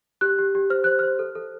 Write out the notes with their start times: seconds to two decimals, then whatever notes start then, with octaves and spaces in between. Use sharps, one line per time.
0.21 G4 F#6
0.39 G4
0.55 G4
0.70 C5 F6
0.84 C5 F#6
0.99 C5 F6
1.19 A4
1.35 A4